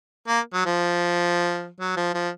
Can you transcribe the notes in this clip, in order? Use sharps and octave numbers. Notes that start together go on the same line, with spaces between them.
A#3
F#3
F3
F#3
F3
F3